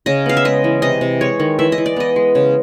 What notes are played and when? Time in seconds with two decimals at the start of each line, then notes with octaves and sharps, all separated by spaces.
0.06 C#3 D#5
0.26 B3 F5
0.37 E5
0.45 G#3 D#5
0.64 E3
0.82 C3 D#5
1.01 C3
1.21 G#3 C#5
1.40 D#3
1.59 E3 E5
1.72 D#5
1.78 E3
1.86 D5
1.96 B3 D#5
2.16 G#3
2.35 C#3